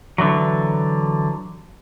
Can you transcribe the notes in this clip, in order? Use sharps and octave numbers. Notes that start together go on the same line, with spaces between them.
D3 E3 F#3